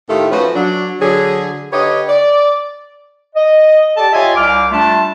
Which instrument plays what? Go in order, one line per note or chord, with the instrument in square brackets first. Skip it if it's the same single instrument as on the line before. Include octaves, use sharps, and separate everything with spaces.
[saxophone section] A2 D#3 A3 F4 G4 A4
F3 A3 C#4 F#4 A4 B4
F#3 D4
D3 F#3 G#4
D3 G4 B4 C#5 D#5
D5
[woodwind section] D#5
G4 A4 D5 A5
F4 G4 C#5 D#5 E5 G#5
C2 D6 F6
G3 A3 D4 F4 A5